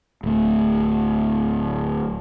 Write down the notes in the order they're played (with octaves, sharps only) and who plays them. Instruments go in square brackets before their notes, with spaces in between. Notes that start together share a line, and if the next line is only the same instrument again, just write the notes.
[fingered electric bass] D1 A3